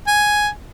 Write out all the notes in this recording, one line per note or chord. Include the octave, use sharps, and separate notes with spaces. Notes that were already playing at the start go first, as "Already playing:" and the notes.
G#5